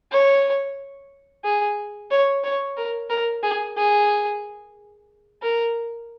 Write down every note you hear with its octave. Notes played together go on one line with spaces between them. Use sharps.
C#5
G#4
C#5
C#5
A#4
A#4
G#4
G#4
A#4